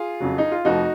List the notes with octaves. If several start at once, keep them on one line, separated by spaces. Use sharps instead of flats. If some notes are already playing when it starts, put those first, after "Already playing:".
Already playing: F4 G#4
F2 C#3 F#3
D#4
F4
F1 F2 F3 D#4 F#4